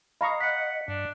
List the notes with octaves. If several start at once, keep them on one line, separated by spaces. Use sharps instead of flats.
D#5 F5 A#5 B5 C#6 D#6
F#5 B6 C#7
G2 D4